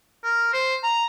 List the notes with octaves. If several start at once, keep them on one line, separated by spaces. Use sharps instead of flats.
A#4
C5
A#5